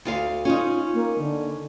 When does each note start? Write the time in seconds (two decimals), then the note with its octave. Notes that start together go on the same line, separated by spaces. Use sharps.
0.05 D2 F4 F5
0.45 C#4 D#4 F4
0.94 A#3
1.18 D3